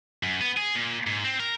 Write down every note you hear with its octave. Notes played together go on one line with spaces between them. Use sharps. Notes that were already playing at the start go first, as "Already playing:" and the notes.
F#2
B3
G#4
A#2
G#2
C4
A#4